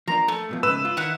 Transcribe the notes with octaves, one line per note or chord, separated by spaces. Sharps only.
F3 A#3 D4 A#5
A3 A4
G#2 B2 F3
G#2 C#3 B4 E6 E7
F4
D#3 E4 F5 F#5